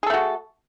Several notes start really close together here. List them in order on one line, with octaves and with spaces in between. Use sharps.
G#4 A4 A3 F#4